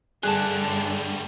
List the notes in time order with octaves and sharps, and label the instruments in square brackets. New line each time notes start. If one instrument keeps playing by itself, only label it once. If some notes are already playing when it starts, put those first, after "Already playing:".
[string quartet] G2 D3 [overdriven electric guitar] G3 A3 [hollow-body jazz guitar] G#4 [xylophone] A5 F#6